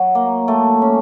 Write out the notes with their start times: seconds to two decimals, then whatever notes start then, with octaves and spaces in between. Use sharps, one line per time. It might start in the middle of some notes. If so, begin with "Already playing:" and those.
Already playing: F#3
0.15 A#3
0.48 A3
0.82 C#4